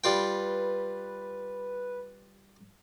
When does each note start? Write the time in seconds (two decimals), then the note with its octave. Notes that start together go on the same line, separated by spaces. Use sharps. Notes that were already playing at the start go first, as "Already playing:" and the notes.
0.04 G3 F4 B4 G5